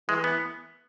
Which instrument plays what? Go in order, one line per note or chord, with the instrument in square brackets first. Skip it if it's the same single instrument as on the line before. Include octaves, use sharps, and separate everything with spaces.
[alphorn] E3 [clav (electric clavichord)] G#3
[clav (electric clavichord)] B3